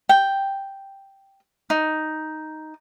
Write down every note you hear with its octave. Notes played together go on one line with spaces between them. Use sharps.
G5
D#4